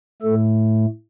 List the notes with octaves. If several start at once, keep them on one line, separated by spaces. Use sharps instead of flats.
A2 A3 A4